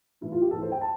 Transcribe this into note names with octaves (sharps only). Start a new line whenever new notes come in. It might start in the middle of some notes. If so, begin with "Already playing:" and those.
A2 E3 A3 E4
F4
G4
A2 E3 A3 A4
C5
G5
A5